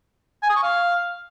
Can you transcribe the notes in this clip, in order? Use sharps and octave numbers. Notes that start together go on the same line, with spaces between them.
G#5
D#6
C#6
F5